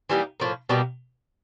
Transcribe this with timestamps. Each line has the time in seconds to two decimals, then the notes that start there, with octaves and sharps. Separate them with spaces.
0.09 E3 G3 A#3 D#4
0.40 A2 F3 A#3
0.69 B2 G3 A#3